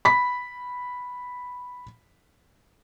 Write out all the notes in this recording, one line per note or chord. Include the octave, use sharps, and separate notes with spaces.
B5 B6